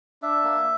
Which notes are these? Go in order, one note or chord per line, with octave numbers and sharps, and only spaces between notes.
D4 E5
A#3